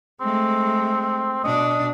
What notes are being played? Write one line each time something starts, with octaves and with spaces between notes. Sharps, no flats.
G#3 A3 C4
B2 D4 D#5